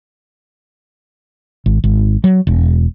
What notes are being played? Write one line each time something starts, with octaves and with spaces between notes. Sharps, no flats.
G#1
G#1
F#3
E1